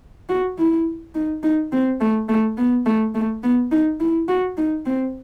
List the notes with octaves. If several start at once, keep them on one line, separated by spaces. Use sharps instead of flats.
F#4
E4
D#4
D#4
C4
A3
A3
B3
A3
A3
B3
D#4
E4
F#4
D#4
C4